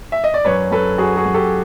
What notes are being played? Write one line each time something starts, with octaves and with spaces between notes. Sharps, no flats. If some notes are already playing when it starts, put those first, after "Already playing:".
E5
D#5
D5
F#2 B4 C#5
F#2 A4 B4
F#2 F#4 G#4
F#4 G#4
F#2
G4 A4